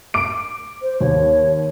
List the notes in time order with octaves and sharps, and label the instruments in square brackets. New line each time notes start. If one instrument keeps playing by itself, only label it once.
[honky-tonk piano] D6 D7
[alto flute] C5
[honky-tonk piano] D#2 [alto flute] C#5